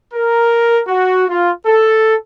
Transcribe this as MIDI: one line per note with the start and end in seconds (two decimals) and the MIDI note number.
0.14 0.81 70
0.87 1.26 66
1.29 1.51 65
1.66 2.15 69